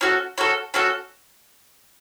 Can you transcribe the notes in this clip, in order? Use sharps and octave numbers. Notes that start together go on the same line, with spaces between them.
C#4 F#4 A4
C#4 F#4 A4
C#4 F#4 A4